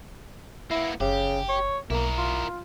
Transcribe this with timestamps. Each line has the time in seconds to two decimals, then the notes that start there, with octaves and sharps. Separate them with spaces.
0.71 A#3 B3 E4
1.00 F#1 C#3 G4
1.49 C#5
1.90 B1 A#3 E4 A#4
2.18 F4